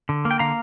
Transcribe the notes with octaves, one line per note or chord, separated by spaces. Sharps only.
D3
A#3
G5
D3 F5 A#5